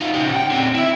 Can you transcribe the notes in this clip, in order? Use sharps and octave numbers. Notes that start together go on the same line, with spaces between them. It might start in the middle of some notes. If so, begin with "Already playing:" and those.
D#4 F4
C#3 G4
F#5 G5
D3 C4
E4 E5